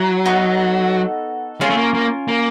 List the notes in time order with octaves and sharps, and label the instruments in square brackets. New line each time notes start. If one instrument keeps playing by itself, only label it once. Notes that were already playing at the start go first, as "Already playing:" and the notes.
Already playing: [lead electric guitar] F#3 [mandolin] E4
[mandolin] B3 D#4 F#4 A4
[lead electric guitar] G#3 [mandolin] C#4 F4 A#4
[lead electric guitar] A3
A#3
A#3
A#3